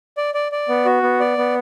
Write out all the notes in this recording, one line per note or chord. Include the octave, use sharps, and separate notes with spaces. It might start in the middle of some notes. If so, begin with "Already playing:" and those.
D5
D5
D5
B3
F#4
B3
D5
B3